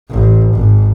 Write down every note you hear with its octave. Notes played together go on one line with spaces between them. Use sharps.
A1
G#1